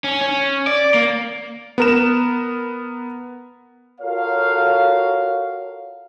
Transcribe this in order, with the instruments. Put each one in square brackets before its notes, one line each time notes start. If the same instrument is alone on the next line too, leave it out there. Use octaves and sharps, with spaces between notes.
[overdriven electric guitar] C#4
C#4
D5
A#3
[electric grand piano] B3 A#4 E7
[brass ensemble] F4 F#4 A4 A#4 C#5 F5